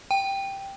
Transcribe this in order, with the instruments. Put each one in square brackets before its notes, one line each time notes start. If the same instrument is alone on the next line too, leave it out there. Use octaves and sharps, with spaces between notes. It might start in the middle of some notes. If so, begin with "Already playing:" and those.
[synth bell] G5